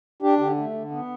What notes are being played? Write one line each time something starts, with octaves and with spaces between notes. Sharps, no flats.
D4 G4
D3 G4
A3
D3
B3